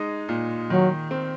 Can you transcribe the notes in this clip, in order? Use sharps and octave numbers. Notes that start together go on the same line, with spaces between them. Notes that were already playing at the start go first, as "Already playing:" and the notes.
Already playing: G#3 D#4
A#2
D#3 F#3
C4